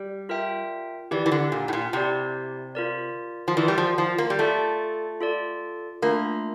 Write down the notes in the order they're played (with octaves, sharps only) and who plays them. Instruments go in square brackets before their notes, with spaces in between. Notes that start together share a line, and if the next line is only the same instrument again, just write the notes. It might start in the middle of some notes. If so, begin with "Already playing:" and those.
Already playing: [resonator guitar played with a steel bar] G3
[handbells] F4 A#4 E5 G5
[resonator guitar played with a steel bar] E3 [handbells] E4 G4 D5
[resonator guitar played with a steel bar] E3
D3
A#2
A2
A#2
[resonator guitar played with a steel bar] C3 [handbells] E4 G4 D5
[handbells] F4 A#4 D5
[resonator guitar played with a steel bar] F3
[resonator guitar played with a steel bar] E3 [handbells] F4 A#4 D5
[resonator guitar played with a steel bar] G3
F3
F3
A#3
G3
[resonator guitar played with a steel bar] A3 [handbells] F4 A4 D5
[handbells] F4 A4 D5
[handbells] A3 D4 F4 [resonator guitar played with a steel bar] A#3